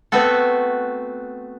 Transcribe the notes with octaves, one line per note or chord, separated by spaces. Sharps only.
A3 B3 C4 F#4 A4